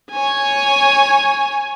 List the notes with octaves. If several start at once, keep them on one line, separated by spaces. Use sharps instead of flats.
C#5 G#5